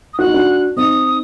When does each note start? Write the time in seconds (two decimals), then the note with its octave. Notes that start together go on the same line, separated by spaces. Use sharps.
0.14 D#6
0.19 F#4 F#6
0.26 D#4
0.34 D4 F#4
0.77 C4 D#4 D#6